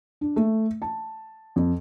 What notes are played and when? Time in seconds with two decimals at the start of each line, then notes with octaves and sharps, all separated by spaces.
0.21 D4
0.36 A3
0.82 A5
1.56 F2